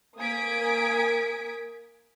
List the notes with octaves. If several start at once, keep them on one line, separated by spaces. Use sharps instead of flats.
A#3 G#5 D#6 G#6 B6 D7